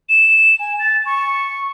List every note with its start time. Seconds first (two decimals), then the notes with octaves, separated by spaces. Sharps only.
0.09 E7
0.59 G#5
0.79 A6
1.06 C#6